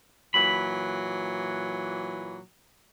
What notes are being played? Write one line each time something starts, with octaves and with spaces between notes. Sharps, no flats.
A#2 E3 F#3 B5